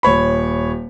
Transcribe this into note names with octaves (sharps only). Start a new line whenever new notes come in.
D#1 C#5 B5